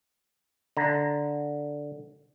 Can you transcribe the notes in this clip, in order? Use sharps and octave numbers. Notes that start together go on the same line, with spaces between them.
D3 A#5